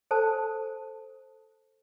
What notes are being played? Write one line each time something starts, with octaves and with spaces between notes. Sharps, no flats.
A4 C5 A5